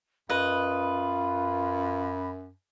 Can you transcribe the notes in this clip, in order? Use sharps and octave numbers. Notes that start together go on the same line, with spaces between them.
F#2 F4 B4 D#5 B5